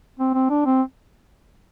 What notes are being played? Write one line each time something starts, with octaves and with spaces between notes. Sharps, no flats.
C4
C4
D4
C4